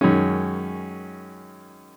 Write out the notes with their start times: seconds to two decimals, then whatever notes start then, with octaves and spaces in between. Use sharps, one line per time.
0.01 F#2 D#3 G#3 C#4